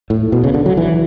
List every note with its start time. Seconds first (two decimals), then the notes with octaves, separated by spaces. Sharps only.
0.10 A2
0.32 B2
0.44 C#3
0.54 D3
0.66 F#3
0.77 E3